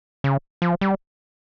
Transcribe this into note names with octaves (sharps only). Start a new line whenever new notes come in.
C#3
F3
G3